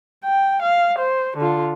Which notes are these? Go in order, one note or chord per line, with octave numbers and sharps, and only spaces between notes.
G5
F5
C5
D3 F4